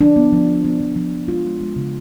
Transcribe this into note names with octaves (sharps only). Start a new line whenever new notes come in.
F3 D4
B3
F3
B3
B3
F3
F3
F3
G#3 F4
G#3
G#3
C#3